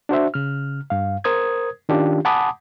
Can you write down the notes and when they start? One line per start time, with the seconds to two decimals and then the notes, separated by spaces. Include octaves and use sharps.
0.09 D4 F#4 C5 E5
0.34 C#3 F6
0.90 G2 F5
1.24 A#4 C5 D#6 G#6
1.89 D#3 C#4 D4 F4 G4
2.25 F#5 G#5 A5 B5 D6 D#6